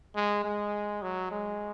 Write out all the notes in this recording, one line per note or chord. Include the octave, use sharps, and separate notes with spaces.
G#3
G#3
F#3
G#3